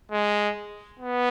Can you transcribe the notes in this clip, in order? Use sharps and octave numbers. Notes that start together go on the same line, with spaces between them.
G#3
B3